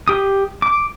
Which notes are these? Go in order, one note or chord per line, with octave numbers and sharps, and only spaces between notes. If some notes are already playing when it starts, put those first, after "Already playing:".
G4 D#6
D6